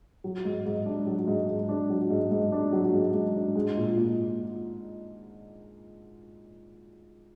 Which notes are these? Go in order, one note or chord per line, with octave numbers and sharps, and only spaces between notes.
F#3
G#2
G#2
D4
F#3
G#2
G#2
D4
F#3
G#2
G#2
D4
F#3
G#2
G#2
D4
G#3
A#2
A#2